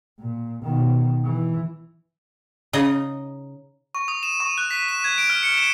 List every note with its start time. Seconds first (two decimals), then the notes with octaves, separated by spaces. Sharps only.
0.19 A#2
0.63 B2 D#3
1.24 E3
2.73 C#3 D#4 D#5
3.95 C#6
4.08 D#6
4.23 E7
4.40 C#6
4.58 F#6
4.71 B6
4.89 E7
5.04 G#6
5.18 D7
5.30 F6
5.43 C#7
5.57 E7